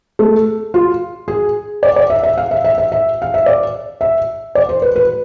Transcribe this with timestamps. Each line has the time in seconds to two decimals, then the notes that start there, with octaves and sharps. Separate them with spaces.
0.19 A3
0.74 F4
1.28 G#4
1.83 D5
1.96 D5
2.10 E5
2.23 E5
2.38 F5
2.51 E5
2.64 E5
2.78 E5
2.92 E5
3.22 F5
3.34 E5
3.46 D5
4.01 E5
4.55 D5
4.69 C5
4.82 B4
4.96 B4